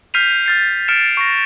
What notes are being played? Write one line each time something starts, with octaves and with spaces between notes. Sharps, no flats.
F6 G6 B6 C7 D#7 F7
F6 A6 C7
F6 A6 C#7 D7 E7
C#6 A#6